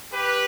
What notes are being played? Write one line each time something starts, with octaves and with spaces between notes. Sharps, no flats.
G4 B4